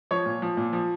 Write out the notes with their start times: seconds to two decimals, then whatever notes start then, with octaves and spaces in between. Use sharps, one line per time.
0.11 F3 C#5
0.26 A#2
0.42 F3
0.57 A#2
0.73 F3